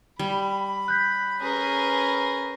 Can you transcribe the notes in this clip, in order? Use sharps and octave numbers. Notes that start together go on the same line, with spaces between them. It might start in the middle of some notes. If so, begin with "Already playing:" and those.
G3 B5
F#6 G6 B6
C#4 G#4 A#4 B4